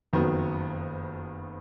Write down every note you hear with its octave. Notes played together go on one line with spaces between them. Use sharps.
F#1 F2 D#3 F#3 B3